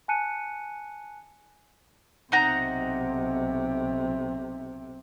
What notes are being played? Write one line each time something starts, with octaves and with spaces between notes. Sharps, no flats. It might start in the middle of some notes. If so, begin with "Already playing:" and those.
G#5 A5 F#6 C#7 D#7
B1 C3 D#4 F#5 A#5